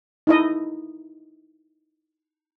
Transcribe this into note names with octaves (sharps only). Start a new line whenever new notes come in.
D#4 E4 D#5